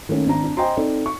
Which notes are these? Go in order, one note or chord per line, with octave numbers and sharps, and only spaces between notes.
D#3 A3 A#3 C#4
G#1 D4 A#5
D4
C5 D#5 G5 G#5 A#5 C6
C4 D#4 A4 D5
C#6